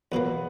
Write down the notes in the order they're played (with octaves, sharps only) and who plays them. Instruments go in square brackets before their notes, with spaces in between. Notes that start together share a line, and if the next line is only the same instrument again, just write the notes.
[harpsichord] E2 B2 F#3 A#3 [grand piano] B3